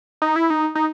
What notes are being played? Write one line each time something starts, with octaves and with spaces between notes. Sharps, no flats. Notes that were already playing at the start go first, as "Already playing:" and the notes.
D#4
E4
D#4
D#4